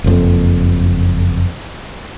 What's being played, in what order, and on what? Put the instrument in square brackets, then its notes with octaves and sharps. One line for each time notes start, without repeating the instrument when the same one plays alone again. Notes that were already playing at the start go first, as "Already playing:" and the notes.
[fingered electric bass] F#1 F2